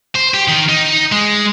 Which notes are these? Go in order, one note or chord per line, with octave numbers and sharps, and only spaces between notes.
C5
G4
D#3
D#4
G#3